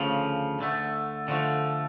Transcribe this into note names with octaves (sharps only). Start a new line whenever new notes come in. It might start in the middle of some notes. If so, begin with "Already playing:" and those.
Already playing: D2 C#3 F3
D2 D3 A3
D3 F3 A3